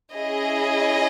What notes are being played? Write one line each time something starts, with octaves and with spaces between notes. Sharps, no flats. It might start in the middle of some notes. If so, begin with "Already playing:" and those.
C#4 E4 G#4 D#5